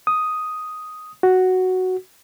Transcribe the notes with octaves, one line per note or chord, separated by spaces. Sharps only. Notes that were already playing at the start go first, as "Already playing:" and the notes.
D#6
F#4